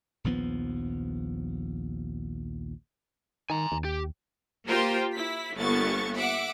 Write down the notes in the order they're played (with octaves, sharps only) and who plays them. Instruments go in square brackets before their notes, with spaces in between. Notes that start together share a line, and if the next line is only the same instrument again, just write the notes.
[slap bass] A#1 D#2 F3 B3
[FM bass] D#3 [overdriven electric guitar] G#5 A#5
[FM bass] D#2
[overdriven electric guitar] G4
[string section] A#3 F4 G4 A#4 C5 G5
E4 B6
G1 A#3 B3 C#6 A6
E5 F#5 D6